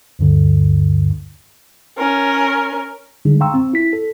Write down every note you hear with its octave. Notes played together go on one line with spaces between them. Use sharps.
D2 G2 D3
C#4 A#4
D3 G3 G#3 D4 D#4 G#4
F5 G5 A#5 C6 C#6 E6
C4
E4 B6
A4